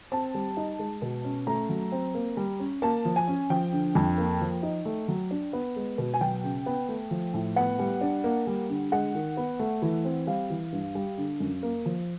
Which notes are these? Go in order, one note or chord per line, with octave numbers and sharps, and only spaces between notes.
C4 A5
G3
D#4
G#3
B2
C#4
A3 A#5
F#3
C4
A#3
G3
C#4
A#3 A5
F3
G#5
C#4
F3 G5
D3
F2
A#3
F3
D#4
A3
F#3
D4
B3
G#3
B2
G#5
F#3 G5
C#3
B3
A3
F3
A2
B3 F#5
G3
D4
A#3
G3
D3
G#3 F#5
D#3
B3
A3
E3
C4
G3 F5
E3
G2
G3
D3
F#2
A#3
F3